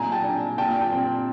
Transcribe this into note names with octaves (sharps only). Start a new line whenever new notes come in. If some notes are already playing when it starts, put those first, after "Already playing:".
Already playing: A#2 G#5 A#5
G5 A5
D4
A#2 G5 A5
G5 A5
C4